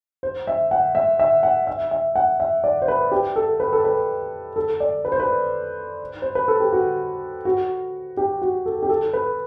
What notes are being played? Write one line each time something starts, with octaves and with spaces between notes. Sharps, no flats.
C5
E5
F#5
E5
E5
F#5
E5
E5
F#5
E5
D5
C5
B4
G4
A4
B4
A4
B4
A4
D5
B4
C5
B4
C5
B4
A4
G4
F#4
F#4
G4
F#4
A4
G4
A4
B4